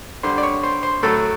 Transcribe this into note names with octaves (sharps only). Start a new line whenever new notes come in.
D3 G3 C5
D5
C#5
C5
C5
A2 F#3 A3 A4